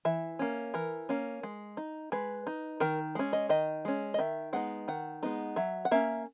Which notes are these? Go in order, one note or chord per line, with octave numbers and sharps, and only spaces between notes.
E3 E5
A#3 C#4
E3 A#4
A#3 C#4
G#3
D#4
G#3 B4
D#4
D#3 A#4
G#3 C#4
D#5
D#3 D#5
G#3 C#4
D#5
D#3 E5
G#3 B3 D#4 F#5
D#3 F#5
G#3 B3 D#4
F#3 E5
F#5
A#3 C#4 E5